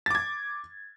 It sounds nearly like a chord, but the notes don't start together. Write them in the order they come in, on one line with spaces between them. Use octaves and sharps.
A6 D6 G#6